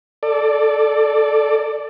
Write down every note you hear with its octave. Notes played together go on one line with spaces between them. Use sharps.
A4 D5